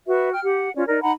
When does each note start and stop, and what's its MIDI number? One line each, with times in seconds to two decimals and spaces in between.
0.07 0.32 66
0.07 0.32 71
0.07 0.32 76
0.33 0.43 79
0.33 0.43 89
0.44 0.70 67
0.44 0.70 78
0.75 0.85 61
0.75 0.85 65
0.75 0.85 74
0.87 1.01 63
0.87 1.01 70
0.87 1.01 74
1.01 1.12 63
1.01 1.12 78
1.01 1.12 82
1.01 1.12 83